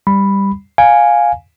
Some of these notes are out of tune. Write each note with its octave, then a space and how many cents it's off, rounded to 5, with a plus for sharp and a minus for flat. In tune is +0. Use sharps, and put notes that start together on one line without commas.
G3 +5 B5 +0
F5 +10 G#5 +0